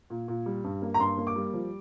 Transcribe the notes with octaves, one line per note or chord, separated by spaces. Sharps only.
A#2
A#2
G3
G2
A#3
A#5
G2 C6
A#3
D6
G3
F3